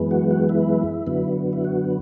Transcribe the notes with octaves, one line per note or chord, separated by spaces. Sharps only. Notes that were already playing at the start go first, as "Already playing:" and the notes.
Already playing: F#2 E3 G#3 B3
F#4
F#4
E4
F#2 D3 F#3 B3
E4
F#4